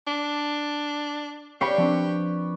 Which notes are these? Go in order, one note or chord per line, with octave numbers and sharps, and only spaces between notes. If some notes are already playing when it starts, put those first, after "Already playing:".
D4
G4 B4 D5 F5 G5 B5 C#6
F3 C4 D4